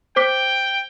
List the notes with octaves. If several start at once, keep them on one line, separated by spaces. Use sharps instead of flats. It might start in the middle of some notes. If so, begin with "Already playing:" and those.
C5 G5 D6 B6